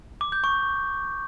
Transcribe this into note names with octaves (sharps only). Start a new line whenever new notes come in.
D6
G6
C#6